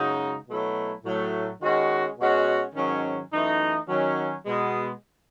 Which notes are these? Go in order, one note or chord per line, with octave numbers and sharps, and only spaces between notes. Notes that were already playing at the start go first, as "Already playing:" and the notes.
Already playing: F#2 C#3 G#3 D#4 F#4
B2 F#3 A3 E4
A2 F#3 A3
D#3 G#3 C#4 F#4
B2 G#3 C#4 F#4
G#2 D#3 F#3 C#4
F#2 E3 A3 D#4
D#3 F#3 C#4
B2 G#3 B3